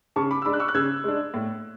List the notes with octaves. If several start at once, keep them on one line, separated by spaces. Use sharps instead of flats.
C#3 A5 C#6
B5 D6
E6
G#3 D4 B5 D6
F#6
C#6 E6
F#6
C#3 E6 G#6
G#3 D4
A2